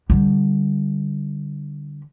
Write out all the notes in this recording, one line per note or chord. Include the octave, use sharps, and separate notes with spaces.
D3 G3